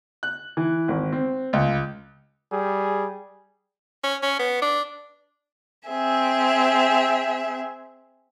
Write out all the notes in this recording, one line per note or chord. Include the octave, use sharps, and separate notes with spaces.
F#6
E3
G#1
C4
C#2
G3 G#4
C#4
C#4
B3
D4
C4 G#4 E5